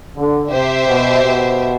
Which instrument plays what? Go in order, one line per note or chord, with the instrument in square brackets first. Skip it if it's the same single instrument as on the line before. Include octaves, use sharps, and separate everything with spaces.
[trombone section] D3
[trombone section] C3 [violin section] G4 C5 E5
[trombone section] B2
B2